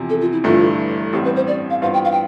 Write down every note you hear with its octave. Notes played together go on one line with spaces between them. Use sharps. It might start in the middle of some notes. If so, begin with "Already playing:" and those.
Already playing: E2 C3 F3
A4
F4
E4
G1 G2 E3 A3 F4
A1 A2 G3 C4 G4
B4
C5
D5
F5
G2 E3 B3 F4 C5 F5
G5
F5
G5